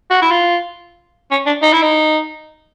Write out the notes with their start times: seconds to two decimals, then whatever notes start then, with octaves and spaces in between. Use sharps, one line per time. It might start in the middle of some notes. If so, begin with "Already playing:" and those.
0.11 F#4
0.22 E4
0.31 F4
1.31 C#4
1.47 D4
1.62 D#4
1.73 E4
1.82 D#4